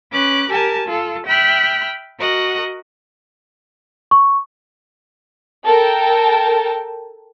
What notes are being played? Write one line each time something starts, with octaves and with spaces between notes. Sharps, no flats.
C#4 B4 D6 F#6
G4 A#4 G#5 A5
F4 A4
E5 G5 B5 F6 F#6
F#4 A#4 D#5 F#5
C#6
A4 A#4 G5 A5